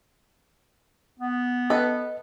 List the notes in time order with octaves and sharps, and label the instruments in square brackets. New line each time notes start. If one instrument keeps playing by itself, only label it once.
[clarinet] B3
[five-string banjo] A4 B4 [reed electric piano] D#5